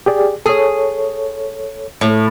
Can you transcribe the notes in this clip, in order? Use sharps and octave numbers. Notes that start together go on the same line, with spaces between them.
G4 G#4 D5
G#4 A4 C#5
A2